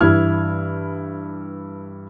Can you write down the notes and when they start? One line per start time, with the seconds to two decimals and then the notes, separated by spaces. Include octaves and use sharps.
0.01 G2 E3 E4 F6 G#6